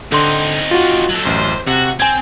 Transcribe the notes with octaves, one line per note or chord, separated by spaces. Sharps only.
D3 C4 D#4 C6
F4 F#4
F#3 A4
A1 F#2 C5
C3 F#4
C4 G#5 G#6